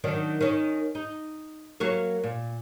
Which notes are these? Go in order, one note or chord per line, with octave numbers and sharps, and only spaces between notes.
D#3 F#3 D4
D#3 C#4
D#4
F#3 A#3 C#5
A#2